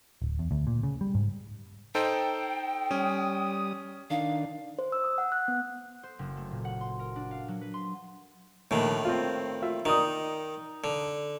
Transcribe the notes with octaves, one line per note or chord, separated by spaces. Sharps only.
D1
E2
D2
A#2
C#3
G3
G#2
D#4 A4 C5 G5
G3 C#4 D#6
D#3 D4 F5
C5
E6
D#6
F#5
F#6
B3
C5
F#1
A3
A#2
F#5
C6
A#4
D4
F5
F#3
B4
C6
A#1 D#2 A2 D#3
C4 F4
F4 E5
D#3 D#4 D5 D#6
D3